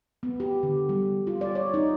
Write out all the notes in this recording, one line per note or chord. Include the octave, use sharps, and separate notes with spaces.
B3
G4
D3
G3
F4
D5
C#5
D#4